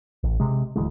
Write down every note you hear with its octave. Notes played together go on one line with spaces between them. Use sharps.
A1
C3 G#3
D1 D2 E3 G#3